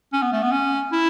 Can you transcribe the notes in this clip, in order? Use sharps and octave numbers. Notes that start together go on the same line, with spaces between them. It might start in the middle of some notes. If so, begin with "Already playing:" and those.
C#4
B3
A3
B3
C#4
E4